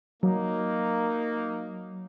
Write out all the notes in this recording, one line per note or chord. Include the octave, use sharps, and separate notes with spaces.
F#3 A#3 D#4